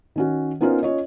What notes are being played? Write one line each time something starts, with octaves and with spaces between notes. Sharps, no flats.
D#3 C#4 F#4
B3 C#4 D#4 F4 A#4 C5
C#4 F4 C#5 D#5